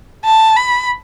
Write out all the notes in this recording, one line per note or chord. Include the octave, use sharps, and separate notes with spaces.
A5
B5